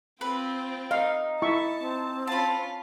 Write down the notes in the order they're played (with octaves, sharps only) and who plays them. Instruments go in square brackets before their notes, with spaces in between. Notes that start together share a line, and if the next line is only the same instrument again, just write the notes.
[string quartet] C4 F4 G5 [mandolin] B4
[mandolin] D#4 [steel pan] F5
[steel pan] E4 E5 C#6 [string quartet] A5
[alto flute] C4
[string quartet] C#4 F4 [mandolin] A5 B5